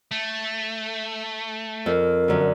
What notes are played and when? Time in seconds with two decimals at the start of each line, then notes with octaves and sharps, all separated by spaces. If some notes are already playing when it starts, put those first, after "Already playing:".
0.11 A3
1.86 F2 A#4
2.28 F#2 D3